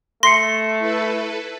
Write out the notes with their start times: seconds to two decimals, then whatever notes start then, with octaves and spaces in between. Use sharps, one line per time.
0.23 A3 C6 A#6 C7 C#7
0.78 E4 A4 B4